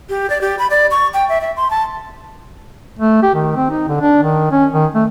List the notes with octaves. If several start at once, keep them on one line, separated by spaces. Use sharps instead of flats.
G4
D5
G4
B5
D5
C#6
G5
E5
E5
C6
A5
A3
G4
D#3
C4
D#4
D3
D4
D#3
C#4
D#3
A3